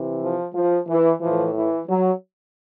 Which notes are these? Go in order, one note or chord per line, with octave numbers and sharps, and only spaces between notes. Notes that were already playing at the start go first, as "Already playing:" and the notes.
Already playing: C3 E3
F3
F3
E3
A2 E3 F3
E3
F#3